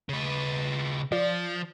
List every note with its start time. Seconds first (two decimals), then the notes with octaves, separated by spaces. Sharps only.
0.09 C#3 B4
1.12 F3 F4 D5